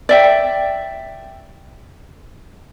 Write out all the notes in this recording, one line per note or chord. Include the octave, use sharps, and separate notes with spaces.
D5 E5 G5